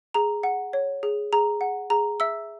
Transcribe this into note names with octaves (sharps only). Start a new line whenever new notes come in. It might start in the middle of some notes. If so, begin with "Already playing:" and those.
G#4 A#5
F#5
C#5
G#4
G#4 A#5
F#5
G#4 A#5
E5 E6